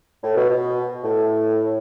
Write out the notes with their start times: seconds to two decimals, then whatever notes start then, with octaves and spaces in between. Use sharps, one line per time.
0.23 A2
0.36 B2
0.50 B2
1.04 A2